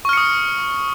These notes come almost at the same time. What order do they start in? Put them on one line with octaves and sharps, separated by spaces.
C#6 F6 C#7 D#6